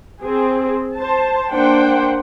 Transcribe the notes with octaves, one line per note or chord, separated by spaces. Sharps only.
C4 G#4
C5 A5
A#3 D4 C5 F#5 G5